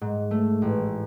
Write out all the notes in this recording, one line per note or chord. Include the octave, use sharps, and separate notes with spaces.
G#2
A3
A1